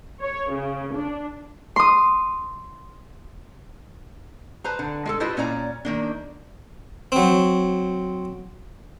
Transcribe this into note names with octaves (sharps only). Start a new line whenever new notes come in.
C#5
C#3
D4
C6 D#6
B4 C5 A#5
D3
G#3 G#4 A4
E4 F4 G4 B4 C5 D#5
A#2 C#4 D5 A#5
D#3 A#3 D4
F#3 C4